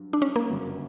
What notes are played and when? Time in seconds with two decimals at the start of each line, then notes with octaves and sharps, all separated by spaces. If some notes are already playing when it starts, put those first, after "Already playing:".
Already playing: G2 F#3
0.13 D4
0.22 C#4
0.36 A#3
0.50 G1 F#2 C#3 F#3